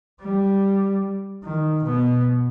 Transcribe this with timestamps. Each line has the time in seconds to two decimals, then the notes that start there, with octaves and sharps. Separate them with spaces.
0.21 G3
1.44 D#3
1.83 B2 B3